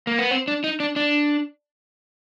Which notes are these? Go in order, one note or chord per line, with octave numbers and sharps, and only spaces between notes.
A#3
B3
C4
D4
D#4
D4
D4